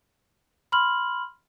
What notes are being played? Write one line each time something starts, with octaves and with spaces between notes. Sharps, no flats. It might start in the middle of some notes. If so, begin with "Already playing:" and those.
B5 C6 F6 F#7